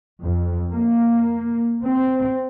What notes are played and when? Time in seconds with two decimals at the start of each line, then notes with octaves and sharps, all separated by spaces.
0.24 F2
0.72 A#3
1.84 C4